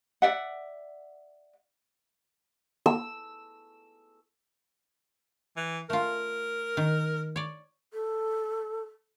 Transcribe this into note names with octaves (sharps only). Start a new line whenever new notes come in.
D5 E5 F#5
E6
E3
A3 F4 A#4
D#3
C#5 D5
A4